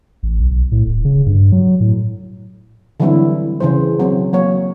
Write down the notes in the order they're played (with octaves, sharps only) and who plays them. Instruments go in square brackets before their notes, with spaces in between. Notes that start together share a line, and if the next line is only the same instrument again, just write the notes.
[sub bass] A1
B1
A2
D1
C#3
G2
F#3
A2
[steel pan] D3 E3 F#3 G3 C4 E4
C#3 E3 C5
F#3 C4
F#3 A#3 C#5